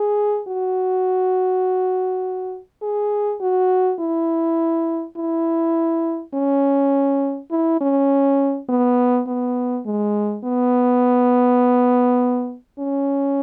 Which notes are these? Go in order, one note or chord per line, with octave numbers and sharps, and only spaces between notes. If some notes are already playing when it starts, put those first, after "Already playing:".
Already playing: G#4
F#4
G#4
F#4
E4
E4
C#4
E4
C#4
B3
B3
G#3
B3
C#4